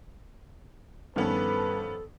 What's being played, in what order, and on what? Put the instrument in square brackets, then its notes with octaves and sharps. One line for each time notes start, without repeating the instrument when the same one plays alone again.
[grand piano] G2 C#4 [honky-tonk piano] D#3 F3 B3 [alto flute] A4 [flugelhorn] B4